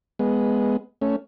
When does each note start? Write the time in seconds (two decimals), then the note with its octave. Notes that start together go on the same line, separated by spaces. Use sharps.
0.19 G#3 B3
1.01 A3 C#4